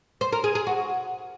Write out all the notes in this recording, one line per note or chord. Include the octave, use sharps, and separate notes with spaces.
C5
A#4
G#4
G#4
F#4